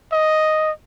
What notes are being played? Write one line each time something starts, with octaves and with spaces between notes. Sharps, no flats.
D#5